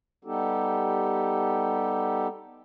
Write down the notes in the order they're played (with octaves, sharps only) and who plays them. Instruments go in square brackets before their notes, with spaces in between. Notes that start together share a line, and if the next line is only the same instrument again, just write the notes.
[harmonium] G3 B3 D#4 G4 A4